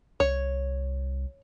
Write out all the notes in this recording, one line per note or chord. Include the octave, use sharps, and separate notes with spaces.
C2 C#5